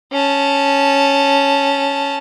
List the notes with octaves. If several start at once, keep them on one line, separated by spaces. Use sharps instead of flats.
C#4 A5